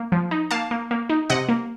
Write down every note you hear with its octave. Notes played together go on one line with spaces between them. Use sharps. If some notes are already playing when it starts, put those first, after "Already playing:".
Already playing: A#3
F3
D#4
A#3 F5 A5
A#3
A#3
D#4
C3 D#5 F#5
A#3